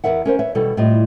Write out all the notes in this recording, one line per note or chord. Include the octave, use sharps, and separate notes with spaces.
E2 G3 A#4 B4 E5 F#5
C#4 A#4 C5
B4 C#5 E5
B2 D#3 G3 E4 A4
A2 G3 F4 D#5